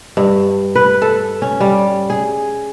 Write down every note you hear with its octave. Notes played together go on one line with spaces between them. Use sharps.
G2
B4
A4
C#4
G3
G#4